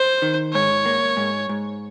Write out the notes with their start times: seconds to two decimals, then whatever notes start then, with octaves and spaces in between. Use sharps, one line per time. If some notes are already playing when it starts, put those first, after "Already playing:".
Already playing: C5
0.22 D#3
0.53 G#2 C#5
0.86 A#3
1.17 G#2
1.49 G#2